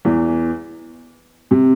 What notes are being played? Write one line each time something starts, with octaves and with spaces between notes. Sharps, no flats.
E2 E3
C3